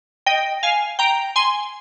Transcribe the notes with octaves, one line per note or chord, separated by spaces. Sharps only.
D#5 G5
F5 G#5
G5 A#5
G#5 C6